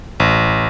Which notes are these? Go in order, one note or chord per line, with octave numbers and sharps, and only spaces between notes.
A1